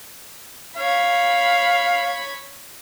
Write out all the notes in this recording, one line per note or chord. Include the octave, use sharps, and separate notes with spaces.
C#5 F5 B5